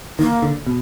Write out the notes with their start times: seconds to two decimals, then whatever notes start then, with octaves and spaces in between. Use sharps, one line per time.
0.19 D#3 A#3
0.42 D3
0.66 B2